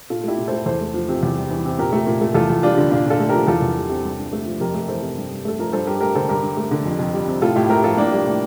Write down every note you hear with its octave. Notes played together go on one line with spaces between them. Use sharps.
A#2 F4 A4
A3 E4 G4
A#2
A3 A4 C5
E2 A4 C5
A3
F3
C3
E2
G3
E3
C3
A#2 G4 A#4
A3
A#2
A3
E2 F4 A4
E2
G3 D4 F4
D3
A#2 D4 F4
A#2 F4 A4
A3
F3 G4 A#4
E2 F4 A4
E2
G3
C3
G2
G2
A3
F3
F2 G4 A#4
A3
E3 A4 C5
C3
G2
G2
A3 A4
F3 A#4
G2 A4 C5
G2 G4 A#4
A3 G4 A#4
D3 A4 C5
G2 G4 A#4
G2
A3
D3
F2
F2
G3
C3
A2 F4 A4
A2 E4 G4
A3 G4 A#4
F3 F4 A4
A2 A#3 D4
G3
A2